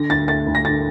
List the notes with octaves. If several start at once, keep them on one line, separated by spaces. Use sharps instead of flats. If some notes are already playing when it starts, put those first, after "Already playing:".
Already playing: D3 A#6
D2 A6
A3 A6
D2
A#6
D3 A6